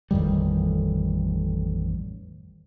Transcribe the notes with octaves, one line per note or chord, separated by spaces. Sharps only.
A1 F2 D#3 G3